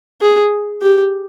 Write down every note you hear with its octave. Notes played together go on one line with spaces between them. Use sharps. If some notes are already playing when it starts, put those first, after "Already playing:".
G#4
G4